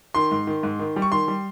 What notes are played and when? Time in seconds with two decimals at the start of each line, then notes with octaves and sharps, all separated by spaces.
0.15 D#3 C6
0.31 G#2
0.47 D#3
0.63 G#2
0.79 D#3
0.96 G3
1.02 C#6
1.12 D#3 C6
1.28 G3